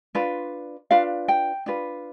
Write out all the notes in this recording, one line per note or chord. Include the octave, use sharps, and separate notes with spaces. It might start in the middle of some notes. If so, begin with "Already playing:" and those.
D4 F4 B4
D4 F4 B4 F5
G5
D4 F4 B4